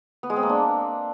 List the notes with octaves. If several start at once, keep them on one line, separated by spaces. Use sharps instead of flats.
B3
G#3
C4
A#3
D4